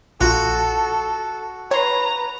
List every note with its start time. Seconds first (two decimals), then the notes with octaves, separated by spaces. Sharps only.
0.21 A#1 F4 F#4 A4
1.71 B4 C#5 A#5 C6